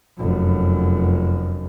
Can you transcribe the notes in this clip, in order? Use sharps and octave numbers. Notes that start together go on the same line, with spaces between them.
F1 F#2